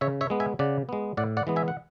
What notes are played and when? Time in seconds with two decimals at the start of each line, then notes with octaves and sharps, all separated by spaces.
0.01 C#3 C#5 E5
0.21 C#5 E5
0.30 G#3 B3
0.40 E5 G#5
0.59 C#3 D5 F#5
0.89 G#3 B3
1.17 A2 D5 F#5
1.37 D5 F#5
1.47 E3 G#3 B3
1.56 E5 G#5
1.68 F#5